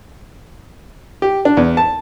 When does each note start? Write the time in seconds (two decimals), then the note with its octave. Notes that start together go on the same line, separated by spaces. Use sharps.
1.22 G4
1.45 D4
1.57 E2
1.77 A5